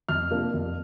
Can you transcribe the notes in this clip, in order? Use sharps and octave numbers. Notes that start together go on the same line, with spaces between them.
F2 F6
C3 F3 A#3 D4
F2